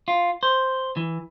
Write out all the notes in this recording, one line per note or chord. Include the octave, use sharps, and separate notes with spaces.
F4
C5
E3